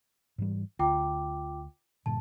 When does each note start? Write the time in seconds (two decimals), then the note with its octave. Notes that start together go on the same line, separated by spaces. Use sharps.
0.38 G#2 E3 G3
0.79 D2 F4 G5 D6
2.06 G2 A#2 D3 A5